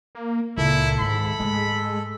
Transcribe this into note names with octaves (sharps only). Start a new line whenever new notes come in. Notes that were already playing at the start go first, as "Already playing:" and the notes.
A#3
C#2 A#2 E4 A4
G#2 D#3 B5
G#2 G#3 A3